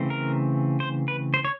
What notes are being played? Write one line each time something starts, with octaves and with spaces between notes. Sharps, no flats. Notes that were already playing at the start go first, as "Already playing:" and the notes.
Already playing: C#3 E3 A3 C4
A#4
C5
B4
C5
C#5